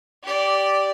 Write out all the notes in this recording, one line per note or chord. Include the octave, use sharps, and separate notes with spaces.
G4 D5